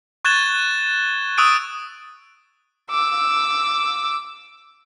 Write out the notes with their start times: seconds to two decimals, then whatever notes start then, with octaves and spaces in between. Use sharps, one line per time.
0.25 C#6 F#6 G#6 A6 E7 G7
1.38 C#6 D#6 E6 F#6 D7 D#7
2.90 D6 E6